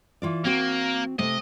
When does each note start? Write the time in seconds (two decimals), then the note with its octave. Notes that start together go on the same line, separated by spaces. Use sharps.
0.22 E3 F4 D5
0.45 A#3 C4 F#4
1.19 C3 A3 D#5